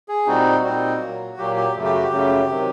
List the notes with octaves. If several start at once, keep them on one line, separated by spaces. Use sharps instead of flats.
G#4
A#2 G3 C4 D#4 F#4
A#2 G3 C4 D#4 F#4
A#2 F#3 A#3
A#2 F#3 A#3 G4
G4
F#2 C#3 F#3 A3
G4
F#4
G4
F#2 C#3 F#3 A3
C3 D#3 F#3